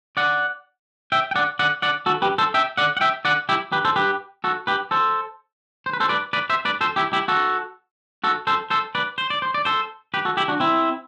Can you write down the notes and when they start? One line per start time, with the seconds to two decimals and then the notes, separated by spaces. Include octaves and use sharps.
0.17 D5 F#5
1.12 E5 G5
1.31 G5
1.36 D5 F#5
1.59 D5 F#5
1.82 D5 F#5
2.06 F#4 A4
2.22 G4 B4
2.38 A4 C5
2.54 E5 G5
2.77 D5 F#5
2.97 F#5
3.01 E5 G5
3.25 D5 F#5
3.49 E4 G4
3.72 G4 B4
3.85 A4 C5
3.96 G4 B4
4.44 F#4 A4
4.67 G4 B4
4.91 A4 C5
5.86 C5
5.93 B4
6.00 A4 C5
6.09 B4 D5
6.33 B4 D5
6.50 C5 E5
6.65 B4 D5
6.81 A4 C5
6.96 E4 G4
7.13 E4 G4
7.28 F#4 A4
8.24 F#4 A4
8.47 A4 C5
8.70 A4 C5
8.95 B4 D5
9.18 C5
9.30 D5
9.42 C5
9.54 D5
9.65 A4 C5
10.14 G4 B4
10.25 F#4 A4
10.37 E4 G4
10.48 D4 F#4
10.60 C4 E4